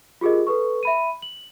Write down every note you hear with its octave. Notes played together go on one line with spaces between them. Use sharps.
F4 G4 G#4 A#4 D#5
A4 B4 C#6
E5 B5 D#7
F#7